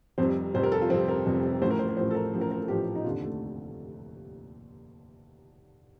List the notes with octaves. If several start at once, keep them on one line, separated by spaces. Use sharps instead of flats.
F1 F2 C3 G3 C5
F1 F2 C3 G3 C5
A#4
A4
F4
F1 F2 C3 G3 C4
A#4
F1 F2 C3 G3
A1 A2 F3 C5
A#4
C5
A#4
A1 A2 F3 C5
A4
A#4
A1 A2 F3
A#4
A#4
A4
A1 A2 F3 G4
D#4
F1 D#2 D3 F4
A3